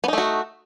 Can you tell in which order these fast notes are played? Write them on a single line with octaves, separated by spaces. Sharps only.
B3 D#4 A3 F#4